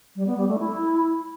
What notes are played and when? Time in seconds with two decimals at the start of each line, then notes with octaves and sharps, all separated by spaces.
0.16 G3
0.27 B3
0.38 G3
0.48 A3
0.59 E4